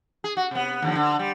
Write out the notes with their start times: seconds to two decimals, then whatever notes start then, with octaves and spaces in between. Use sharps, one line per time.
0.24 G#4
0.37 F#4
0.51 C3 B3
0.82 D#2 D3 F3
0.95 D3
1.19 G3